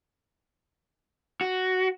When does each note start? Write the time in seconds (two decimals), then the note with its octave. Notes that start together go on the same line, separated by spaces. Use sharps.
1.41 F#4